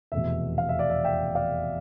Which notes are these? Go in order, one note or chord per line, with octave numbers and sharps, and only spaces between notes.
F1 E2 B2 E5
F5
E5
D5
E5
E5 G5
D5 F5